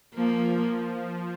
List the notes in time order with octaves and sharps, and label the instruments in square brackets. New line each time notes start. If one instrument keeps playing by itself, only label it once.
[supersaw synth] F3 [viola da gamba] A#3